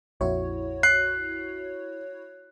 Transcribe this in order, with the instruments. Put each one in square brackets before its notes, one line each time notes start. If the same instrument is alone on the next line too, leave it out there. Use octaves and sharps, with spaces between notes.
[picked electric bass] A#1 F2 [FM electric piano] E4 F#4 C#5
[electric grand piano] F#6 C7